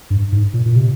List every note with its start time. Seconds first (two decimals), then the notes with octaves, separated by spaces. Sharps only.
0.10 G2
0.32 G#2
0.54 A#2
0.66 A#2
0.76 C3